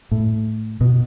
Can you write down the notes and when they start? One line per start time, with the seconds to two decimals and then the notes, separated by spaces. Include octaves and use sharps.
0.11 A2
0.81 B2